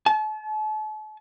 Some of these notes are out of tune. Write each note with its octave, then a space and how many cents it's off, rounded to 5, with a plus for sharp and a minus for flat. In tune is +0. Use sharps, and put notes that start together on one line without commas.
A5 -40